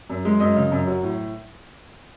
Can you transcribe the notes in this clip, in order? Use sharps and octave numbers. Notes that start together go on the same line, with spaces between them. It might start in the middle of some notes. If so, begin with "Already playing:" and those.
F#2
G#3
F#2 D#5
C#3
F#2
F#3
A2